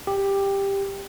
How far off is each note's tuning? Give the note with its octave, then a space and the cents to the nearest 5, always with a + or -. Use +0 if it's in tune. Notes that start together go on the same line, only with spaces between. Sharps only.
G4 +10